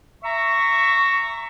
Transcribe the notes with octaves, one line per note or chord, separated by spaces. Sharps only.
E5 A#5 C#6